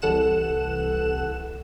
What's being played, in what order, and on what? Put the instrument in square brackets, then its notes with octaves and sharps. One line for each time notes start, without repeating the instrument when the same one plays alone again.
[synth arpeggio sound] C2 E3 A4 F#5 F#6 E7